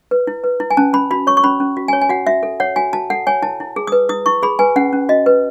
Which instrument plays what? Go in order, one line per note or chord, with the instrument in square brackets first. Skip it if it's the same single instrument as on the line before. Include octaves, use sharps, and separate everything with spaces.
[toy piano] B4
E4
B4
E4
G#5
C#4 A5
C#4 B5
F#4 B5
C#5 C#6
C#6
C#4 B5
C#4
F#4
G#5
C#5
G#5
F#4 F#5
F#4 E5
A4
C#5 F#5
F#4 G#5
F#4 A5
A4 F#5
C#5 G#5
E4 A5
E4
G#4
B4 D#6
E4 D#6
E4 C#6
G#4 B5
B4 G#5
C#4 F#5
C#4
F#4 D#5
B4